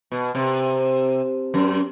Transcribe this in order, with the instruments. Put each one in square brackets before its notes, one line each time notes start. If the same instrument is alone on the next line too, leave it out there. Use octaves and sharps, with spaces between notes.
[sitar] B2
C3
F#2